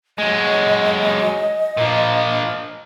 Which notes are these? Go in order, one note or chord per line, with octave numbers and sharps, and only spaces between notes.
F#3 G#3 D#5
A#2 F3